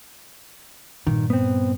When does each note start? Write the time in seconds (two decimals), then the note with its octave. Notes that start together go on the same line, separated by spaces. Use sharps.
1.07 G2 A#2 D#3
1.30 B3 C4